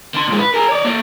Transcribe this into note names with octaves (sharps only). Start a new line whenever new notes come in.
D3 C6
A#2 G#3
B4
G#4 A#4
C#5 D5
A#3 A4